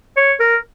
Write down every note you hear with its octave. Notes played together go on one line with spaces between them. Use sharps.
C#5
A#4